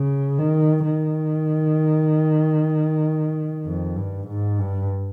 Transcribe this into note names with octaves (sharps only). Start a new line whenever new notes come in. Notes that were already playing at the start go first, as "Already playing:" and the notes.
Already playing: C#3
D#3
D#3
F2
G2
G#2
G2